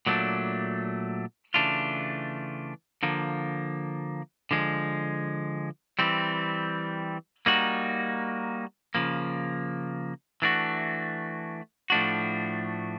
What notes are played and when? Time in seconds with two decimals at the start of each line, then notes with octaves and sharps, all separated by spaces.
0.07 A#2 F#3 A3 D4
1.54 C#3 E3 A3 D4 F4
3.03 D3 F3 A#3
4.51 D3 F3 G#3
5.99 E3 G3 C4
7.46 G3 A#3 D#4 F#4
8.95 C#3 F3 A#3
10.42 E3 A3 D4 F#4
11.90 A2 F3 A3 D4 F#4